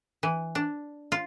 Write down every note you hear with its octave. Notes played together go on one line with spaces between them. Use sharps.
E3
D4
F4